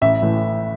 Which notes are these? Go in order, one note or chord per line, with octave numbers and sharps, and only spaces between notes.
A1 E5
A2 E3